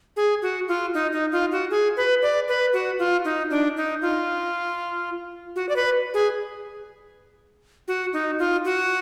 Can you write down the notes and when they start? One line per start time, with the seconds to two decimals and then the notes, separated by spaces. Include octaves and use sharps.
0.16 G#4
0.42 F#4
0.68 F4
0.94 D#4
1.12 D#4
1.32 F4
1.52 F#4
1.70 G#4
1.97 B4
2.22 D5
2.48 B4
2.73 F#4
2.99 F4
3.25 D#4
3.50 D4
3.77 D#4
4.02 F4
5.56 F#4
5.69 D5
5.76 B4
6.14 G#4
7.88 F#4
8.13 D#4
8.39 F4
8.65 F#4